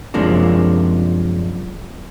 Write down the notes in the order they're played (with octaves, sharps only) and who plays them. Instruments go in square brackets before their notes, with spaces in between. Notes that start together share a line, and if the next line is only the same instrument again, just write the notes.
[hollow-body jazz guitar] F#2 C3 F3 G#3 A#3 D4